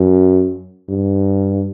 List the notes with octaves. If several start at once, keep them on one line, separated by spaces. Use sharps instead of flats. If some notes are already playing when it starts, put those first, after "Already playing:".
Already playing: F#2
G2